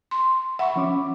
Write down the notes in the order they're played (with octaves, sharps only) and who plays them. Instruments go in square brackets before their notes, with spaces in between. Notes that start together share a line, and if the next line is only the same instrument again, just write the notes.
[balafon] C6
[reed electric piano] E5 B5 C#6 [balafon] F#5
[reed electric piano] F3 C#4 D6